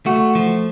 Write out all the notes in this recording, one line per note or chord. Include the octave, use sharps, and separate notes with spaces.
A3 F#4
F3